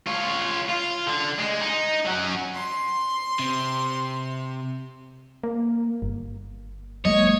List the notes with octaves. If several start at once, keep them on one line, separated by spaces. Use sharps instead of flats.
F4 C#5
F4
D3
G#3
D#4
F#3 C#4
C6
C3
A#3
G1
F#3 G#3 A#3 C#5 D#5